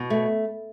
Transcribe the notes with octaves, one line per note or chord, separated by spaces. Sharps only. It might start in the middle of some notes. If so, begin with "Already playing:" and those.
Already playing: B2
A3